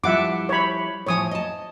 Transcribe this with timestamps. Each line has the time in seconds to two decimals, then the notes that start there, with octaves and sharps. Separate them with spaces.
0.04 F3 G3 E4 E5 F#5 D6
0.49 C#5 B5
1.06 A2 F3 C#5 G#5 D#6
1.31 D#5 A5